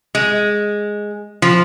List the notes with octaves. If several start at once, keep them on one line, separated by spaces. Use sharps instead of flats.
G#3
F3